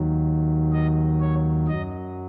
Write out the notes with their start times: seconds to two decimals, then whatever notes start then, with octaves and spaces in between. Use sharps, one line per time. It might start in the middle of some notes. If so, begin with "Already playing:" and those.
Already playing: D#2 D#3 F#3
0.73 D#5
1.20 C#5
1.68 F#2 F#3 D#5